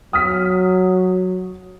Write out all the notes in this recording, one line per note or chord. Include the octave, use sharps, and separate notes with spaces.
F#3 D#6 F6 B6